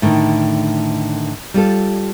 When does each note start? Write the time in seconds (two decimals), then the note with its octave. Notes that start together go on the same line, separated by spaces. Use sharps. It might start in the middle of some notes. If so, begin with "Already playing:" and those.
0.02 A2 D3 D#3 A3
1.54 G3 F4 A4